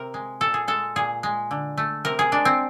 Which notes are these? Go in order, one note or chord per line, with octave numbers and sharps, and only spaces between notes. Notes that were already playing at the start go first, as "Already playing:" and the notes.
Already playing: C3 A#4
G#3
A#2 A4
G#4
G#3 A4
A#2 G#4
G#3
D3
A3
C3 A#4
G#4
G#3 D4
C4